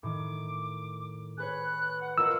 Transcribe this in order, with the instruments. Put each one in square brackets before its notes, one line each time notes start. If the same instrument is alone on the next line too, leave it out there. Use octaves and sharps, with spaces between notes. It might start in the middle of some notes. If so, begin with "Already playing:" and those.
[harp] A2 D#3 [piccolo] D6
[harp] G#4 B4 C#5 [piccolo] F#6
[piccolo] F#5
[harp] F4 A#4 D#5 [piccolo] F#5 [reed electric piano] E6